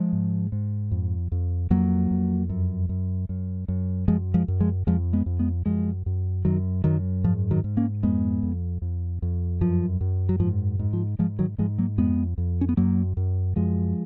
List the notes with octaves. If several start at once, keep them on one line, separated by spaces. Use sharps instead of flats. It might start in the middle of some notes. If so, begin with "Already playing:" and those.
Already playing: F3 G#3
G#2
G#2
F2
F2
F2 F#3 A#3
F2
F#2
F#2
F#2
F#2
F#2 F3 G#3
F3 G#3
F#2
F3 G#3
F2 F3 G#3
G#3 B3
F2
G#3 B3
F#2 F3 G#3
F#2
F#2 D#3 F#3
F#2 D#3 F#3
G#2 F3
D#3 F#3
G#2
A#3 C#4
F2 G#3 B3
F2
F2
F2
F#2 F3
F#2
F#3
G#2 F3
G#2
F3
G#2 F3 G#3
D#3 F#3
G#2 F3 G#3
F#3 A#3
F2 G#3 B3
F2
C#4
B3
F#2 F#3 A#3
F#2
F#2 F3 G#3